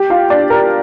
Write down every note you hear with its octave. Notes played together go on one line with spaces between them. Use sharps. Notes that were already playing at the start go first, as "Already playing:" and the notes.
Already playing: G4 G5
F4 F5
D4 D5
A#4